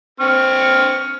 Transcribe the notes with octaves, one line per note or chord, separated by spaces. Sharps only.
C4 C#6 F6